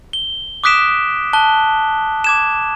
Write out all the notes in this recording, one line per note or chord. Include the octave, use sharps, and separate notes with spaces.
G7
D6 D#6 F#6 B6 D7 E7
A5 F#6 G7
D6 G#6 E7